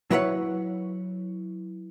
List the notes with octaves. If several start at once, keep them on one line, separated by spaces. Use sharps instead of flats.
F#3 E4 B4 C#5 F#5